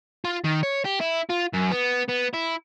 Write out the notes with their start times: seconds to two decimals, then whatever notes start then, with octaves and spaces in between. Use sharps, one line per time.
0.25 F4
0.45 D#3
0.63 C#5
0.85 G4
1.00 E4
1.29 F4
1.53 F#2
1.71 B3
2.08 B3
2.33 E4